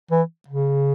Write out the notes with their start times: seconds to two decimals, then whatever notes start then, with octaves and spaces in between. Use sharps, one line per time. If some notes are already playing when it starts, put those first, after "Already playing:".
0.11 E3
0.48 C#3